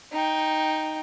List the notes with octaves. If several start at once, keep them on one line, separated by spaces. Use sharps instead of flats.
D#4 G5